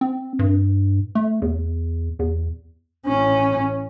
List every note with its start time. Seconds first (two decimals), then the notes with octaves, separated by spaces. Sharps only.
0.01 C4
0.39 G2
1.15 A3
1.42 E2
2.19 E2
3.07 A1 C#4